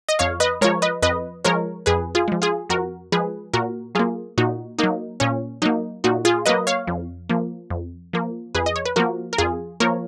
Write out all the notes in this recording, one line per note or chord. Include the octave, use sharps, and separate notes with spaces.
D#5
F2 C#5 F5
B4 D#5
F3 G#3 A#4 C#5
B4 D#5
F2 B4 D#5
F3 G#3 A#4 C#5
F2 G#4 B4
F4 G#4
F3 G#3
F4 G#4
F2 F#4 A#4
F3 G#3 G#4 B4
A#2 F#4 A#4
F#3 A#3 F4 G#4
A#2 D#4 F#4
F#3 A#3 D#4
A#2 C#4
F#3 A#3 D#4
A#2 D#4 F#4
F4 G#4
F#3 A#3 B4 D#5
C#5 F5
F2
F3 A#3
F2
F3 A#3
F2 G#4 B4
D#5
C#5
B4
F3 A#3 F#4 A#4
A#4
F2 F4 G#4
F3 A#3 A#4 C#5